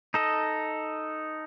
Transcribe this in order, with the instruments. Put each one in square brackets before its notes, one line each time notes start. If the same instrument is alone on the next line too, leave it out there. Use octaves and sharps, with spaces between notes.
[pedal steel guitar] D#4 A4 D#5